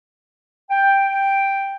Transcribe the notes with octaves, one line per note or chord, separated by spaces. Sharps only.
G5